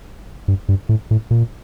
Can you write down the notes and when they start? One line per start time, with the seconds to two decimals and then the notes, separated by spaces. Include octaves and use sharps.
0.48 G2
0.69 G2
0.89 A2
1.11 A2
1.31 A#2